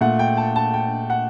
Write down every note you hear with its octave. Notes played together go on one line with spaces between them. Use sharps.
A#2 A3 F#5
G5
A5
A5
G5
F#5